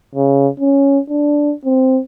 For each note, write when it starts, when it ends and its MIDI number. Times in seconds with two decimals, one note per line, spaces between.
0.15 0.48 49
0.60 0.99 61
1.10 1.54 62
1.65 2.00 60